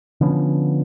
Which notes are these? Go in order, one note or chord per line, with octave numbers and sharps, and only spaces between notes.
D3 F3 B3 C#4